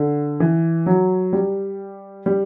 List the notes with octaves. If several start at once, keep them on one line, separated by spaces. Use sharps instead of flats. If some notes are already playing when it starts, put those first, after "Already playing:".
Already playing: D3
E3
F#3
G3
G3